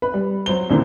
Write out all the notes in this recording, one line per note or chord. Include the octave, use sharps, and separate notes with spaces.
B4
G3
F#3 C5 G7
D#1 C2 D3 E3 A#3 C4